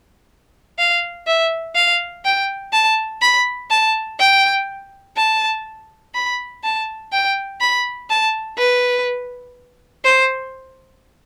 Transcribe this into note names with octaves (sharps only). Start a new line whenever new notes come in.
F5
E5
F5
G5
A5
B5
A5
G5
A5
B5
A5
G5
B5
A5
B4
C5